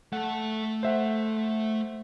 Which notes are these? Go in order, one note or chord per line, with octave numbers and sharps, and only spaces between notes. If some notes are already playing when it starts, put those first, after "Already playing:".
A3 A4 F#5
C5 E5 F#5